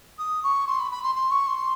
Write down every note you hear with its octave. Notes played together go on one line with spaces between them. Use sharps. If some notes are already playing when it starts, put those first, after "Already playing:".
D#6
C#6
C6
B5
B5
C6
C6
C#6
C6